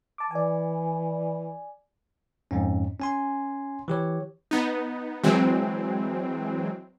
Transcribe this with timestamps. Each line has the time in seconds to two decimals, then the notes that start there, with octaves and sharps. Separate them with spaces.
0.18 A5 D6
0.31 E3 D5 G#5
2.51 F2 G#2 C#4
3.00 C#4 G#5 C6
3.88 E3 G4 C#5
4.51 B3 D#4
5.24 E3 F#3 G#3 C4